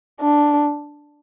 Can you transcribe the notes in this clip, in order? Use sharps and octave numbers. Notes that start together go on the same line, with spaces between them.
D4